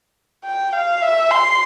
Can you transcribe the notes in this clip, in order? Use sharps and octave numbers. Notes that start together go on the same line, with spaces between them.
G5
F5
E5
C6